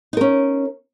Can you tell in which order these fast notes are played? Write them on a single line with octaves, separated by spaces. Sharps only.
D#4 A#4 C#4